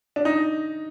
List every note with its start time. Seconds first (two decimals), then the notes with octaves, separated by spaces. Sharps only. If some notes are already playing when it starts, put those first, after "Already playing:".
0.16 D4
0.25 D#4